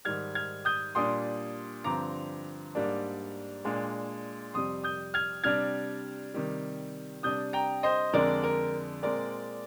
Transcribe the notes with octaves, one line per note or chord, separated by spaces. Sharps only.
G#2 D#3 G3 F6 G#6
F6 G#6
D#6 G6
A#2 G3 D4 C6 D#6
G2 D3 F3 C4 A#5 D6
G#2 G3 A#3 D4
A#2 G#3 D4
F2 C3 G3 C6 D#6
D#6 G6
F6 G#6
C3 G3 D4 F6 G#6
C3 D#3 G3
C3 G3 D4 D#6 G6
G5 A#5
C5 D#5
F2 D3 G#3 D4 A#4 D5
A#4
A#2 G#3 C4 A#4 D5